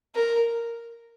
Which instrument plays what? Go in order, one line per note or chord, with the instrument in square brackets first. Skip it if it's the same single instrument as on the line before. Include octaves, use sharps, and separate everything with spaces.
[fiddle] A#4